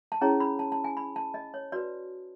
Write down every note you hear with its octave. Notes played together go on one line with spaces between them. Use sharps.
A5
C#4 E4 G#4 C#5 A#5
B5
A5
A5
G#5
B5
A5
D#5
C#5
F#4 B4 D5